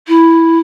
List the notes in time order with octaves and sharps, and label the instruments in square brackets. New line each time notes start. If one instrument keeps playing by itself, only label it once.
[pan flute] E4